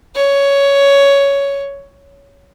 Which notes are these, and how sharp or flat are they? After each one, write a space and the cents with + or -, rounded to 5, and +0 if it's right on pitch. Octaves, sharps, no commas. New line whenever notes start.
C#5 +10